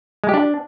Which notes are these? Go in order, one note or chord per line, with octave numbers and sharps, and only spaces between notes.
G#3
G4
D4